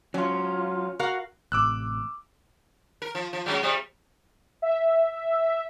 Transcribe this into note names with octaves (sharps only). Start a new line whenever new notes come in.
F#3 C#4 F4
F#4 A#4 F5
A1 A2 C3 D6 E6 F#6
A#4
F3
F3
F#3 G#3 C#4
C3 G3
E5